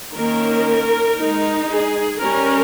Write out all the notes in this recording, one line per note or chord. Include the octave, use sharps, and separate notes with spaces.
D#3 A#3 C#4 A#4
G#3 D#4
G#4
G3 C#4 A#4